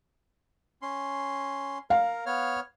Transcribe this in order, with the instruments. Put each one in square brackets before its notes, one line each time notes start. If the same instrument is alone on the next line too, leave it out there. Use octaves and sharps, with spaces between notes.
[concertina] C#4 C6
[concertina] A#4 [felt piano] F5
[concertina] B3 C#5 F6